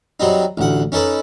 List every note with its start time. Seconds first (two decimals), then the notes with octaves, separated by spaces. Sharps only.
0.20 F#3 G3 C4 D#4
0.58 A1 D2 F#5
0.92 C#4 D#4 A4 B4